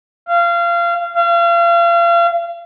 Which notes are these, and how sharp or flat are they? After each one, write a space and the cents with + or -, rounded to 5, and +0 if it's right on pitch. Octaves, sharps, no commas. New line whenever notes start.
F5 -25
F5 -35